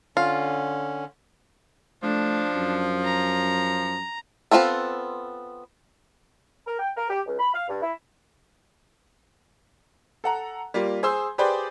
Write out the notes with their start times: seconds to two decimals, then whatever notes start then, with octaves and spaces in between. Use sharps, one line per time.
0.17 D3 C#4 F4
2.03 F3 A3 D4
2.55 F#2
3.05 A#5
4.51 B3 C4 F4 G#4 A4
6.67 A#4
6.79 G5
6.97 A#4
7.10 G4
7.27 C#2
7.39 B5
7.54 F5
7.68 G2
7.82 E4
10.24 A4 F#5 A#5
10.74 G3 A#3 F4
11.03 G#4 C5 C6 E6
11.38 G4 G#4 B4 C5 D5 G5